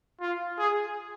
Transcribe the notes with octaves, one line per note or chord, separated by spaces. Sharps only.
F4
G#4